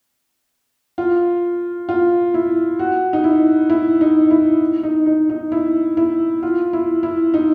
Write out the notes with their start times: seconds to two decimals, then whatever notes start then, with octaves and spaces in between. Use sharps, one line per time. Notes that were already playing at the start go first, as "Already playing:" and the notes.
0.98 F4
1.89 F4
2.34 E4
2.79 F#4
3.13 D#4
3.24 E4
3.70 E4
4.01 D#4
4.31 E4
4.83 D#4
5.06 D#4
5.30 D#4
5.52 E4
5.97 E4
6.43 F4
6.73 E4
7.03 E4
7.34 D#4